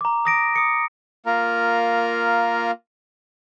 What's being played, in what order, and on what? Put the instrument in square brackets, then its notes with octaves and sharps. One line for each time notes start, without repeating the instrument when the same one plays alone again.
[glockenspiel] A#5 D6
D#6 A#6 D7
D#6 C#7
[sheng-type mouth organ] A#3 F4 A#4 A#5